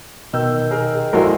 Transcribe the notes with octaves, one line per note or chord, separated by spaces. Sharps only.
B2 D#3 E6 G6
G#4 A#4
A#1 G#3 E4 F#4 A4 A#4